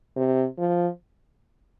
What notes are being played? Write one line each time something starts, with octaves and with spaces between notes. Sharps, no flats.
C3
F3